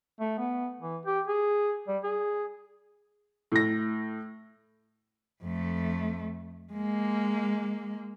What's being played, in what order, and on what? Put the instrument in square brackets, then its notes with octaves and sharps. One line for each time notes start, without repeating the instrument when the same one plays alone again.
[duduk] A3
B3
E3
G4
G#4
G3
G#4
[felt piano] A2 A#6
[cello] F2 A3
G#3 A#3